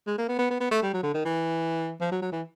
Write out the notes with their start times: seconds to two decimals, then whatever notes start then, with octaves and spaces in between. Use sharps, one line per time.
0.07 G#3
0.18 A#3
0.28 B3
0.38 B3
0.50 B3
0.60 B3
0.71 A3
0.82 G3
0.93 F#3
1.03 D3
1.14 D#3
1.25 E3
2.01 F3
2.11 F#3
2.21 F#3
2.32 E3